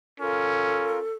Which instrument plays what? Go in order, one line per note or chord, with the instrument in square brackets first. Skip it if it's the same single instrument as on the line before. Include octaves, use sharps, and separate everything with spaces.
[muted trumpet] C#4 [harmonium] F4 A#4 [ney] A4